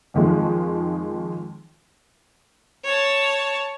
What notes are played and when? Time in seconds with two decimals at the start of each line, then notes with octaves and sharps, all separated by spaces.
0.14 F2 D#3 F3 G#3
2.85 C#5 A5